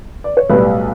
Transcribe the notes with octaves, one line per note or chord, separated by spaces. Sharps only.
D5
C#5
B1 A2 G3 B4